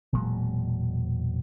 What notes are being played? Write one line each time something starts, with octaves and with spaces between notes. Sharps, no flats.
E1 A#2 F#3 G#3